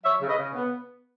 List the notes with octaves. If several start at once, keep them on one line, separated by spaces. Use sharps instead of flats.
F#3 C#5 E5
C#3
B4 D#5
C#3
B3